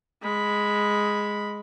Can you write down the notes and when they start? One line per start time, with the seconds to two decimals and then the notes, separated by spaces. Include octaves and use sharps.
0.23 G#3 B5